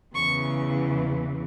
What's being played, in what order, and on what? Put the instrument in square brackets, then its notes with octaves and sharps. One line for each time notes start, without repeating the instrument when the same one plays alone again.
[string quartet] E2 C#3 E3 C#6